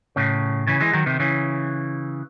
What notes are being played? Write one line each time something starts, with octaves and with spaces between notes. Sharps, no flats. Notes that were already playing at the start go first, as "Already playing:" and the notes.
A2 C#3
C#3 E3
E3 G#3
D#3 F#3
C3 D#3
C#3 E3